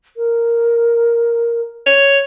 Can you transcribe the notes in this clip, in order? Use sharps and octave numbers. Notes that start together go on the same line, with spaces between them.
A#4
C#5